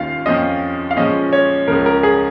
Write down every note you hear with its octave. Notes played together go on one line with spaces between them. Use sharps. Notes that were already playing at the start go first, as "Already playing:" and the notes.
Already playing: D#2 D#3 C#4 F4 F5
F2 F3 C#4 F4 D#5
F5
A#2 F3 G#3 C#4 D#5
C#5
C#2 C#3 F3 A#4
A#4
G#4